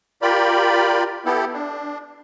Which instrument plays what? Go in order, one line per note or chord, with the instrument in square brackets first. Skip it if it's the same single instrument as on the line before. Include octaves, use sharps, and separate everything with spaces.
[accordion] F4 G4 A#4 D5 B5
B3 E4 G4 A4
D4